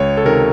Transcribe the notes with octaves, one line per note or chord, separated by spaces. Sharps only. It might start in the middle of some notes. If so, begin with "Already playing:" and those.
Already playing: C#2 C#5
A4
C3 D#3 A#4